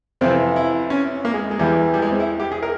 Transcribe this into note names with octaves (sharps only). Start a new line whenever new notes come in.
F2 C3 E3 C4
E4
C#4
A#3
G#3
G#3
E2 E3 G3
G3
G#3
C4
E4
G4
G#4
A#4